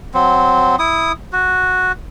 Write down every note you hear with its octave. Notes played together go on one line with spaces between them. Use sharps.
F#3 C4
E4 D#6
F#4